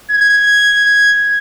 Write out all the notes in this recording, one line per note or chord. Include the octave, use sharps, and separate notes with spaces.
G#6